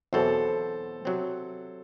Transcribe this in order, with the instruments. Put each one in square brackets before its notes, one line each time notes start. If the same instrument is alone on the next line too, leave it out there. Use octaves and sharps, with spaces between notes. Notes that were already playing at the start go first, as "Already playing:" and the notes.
[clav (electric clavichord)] E2 B2 F#3 C4 [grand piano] A4 C5
[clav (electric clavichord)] C3 F#3 C4